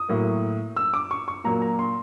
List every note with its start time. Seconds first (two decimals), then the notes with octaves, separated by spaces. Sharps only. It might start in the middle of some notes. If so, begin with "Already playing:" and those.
Already playing: D#6
0.09 A2 F#3 A#3
0.76 E6
0.94 D6
1.11 C#6
1.28 C#6
1.44 A#2 F#3 A#3 A#5
1.62 A#5
1.79 C6